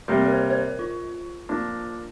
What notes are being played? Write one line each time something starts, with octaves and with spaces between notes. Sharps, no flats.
C3 G3 A#3 A#4
A#4
C5
C5
A#4
F4
F3 A#3 D4